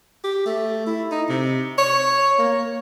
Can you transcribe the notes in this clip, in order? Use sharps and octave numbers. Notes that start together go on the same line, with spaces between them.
G4
A3
E4
D#4
C3
C#5
A#3